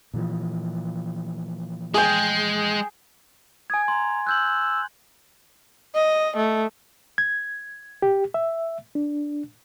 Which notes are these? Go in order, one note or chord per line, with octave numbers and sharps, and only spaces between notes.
A#2 E3 F3
G#3 G#4 G5
G#5 D#6 G#6
A#5 C6
E6 F#6 G6 F#7
D#5
A3
G#6
G4
E5
D4